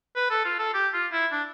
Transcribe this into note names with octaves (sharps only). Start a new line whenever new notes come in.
B4
A4
F4
A4
G4
F4
E4
D4